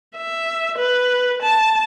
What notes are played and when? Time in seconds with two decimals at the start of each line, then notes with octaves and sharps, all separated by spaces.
0.16 E5
0.78 B4
1.42 A5